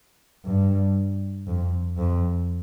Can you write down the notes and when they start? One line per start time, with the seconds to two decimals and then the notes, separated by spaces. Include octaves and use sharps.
0.45 G2
1.47 F2
1.98 F2